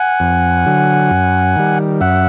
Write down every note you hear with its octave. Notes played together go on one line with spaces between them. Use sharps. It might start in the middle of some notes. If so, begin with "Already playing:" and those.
Already playing: F#5 G#5
F2
D3 F#3
F#2
D#3 G3
F#2 E5 F#5